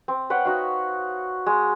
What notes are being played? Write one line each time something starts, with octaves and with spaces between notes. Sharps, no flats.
C4
B4 C#5 F#5 G5
D#4 F#4 F5
G#3